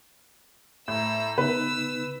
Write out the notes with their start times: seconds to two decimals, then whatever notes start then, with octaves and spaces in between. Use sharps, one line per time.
0.88 A2 A#5 E6
1.38 C#3 B3 D#4 B4 E6